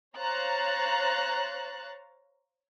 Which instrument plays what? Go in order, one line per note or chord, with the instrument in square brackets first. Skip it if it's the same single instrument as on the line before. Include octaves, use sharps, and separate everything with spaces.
[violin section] C5 C#5 F5 A#5 F#6 A6